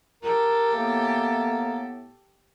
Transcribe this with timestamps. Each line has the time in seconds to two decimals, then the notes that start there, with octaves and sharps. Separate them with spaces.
0.22 G4 A4 A#4
0.73 A2 A#3 B3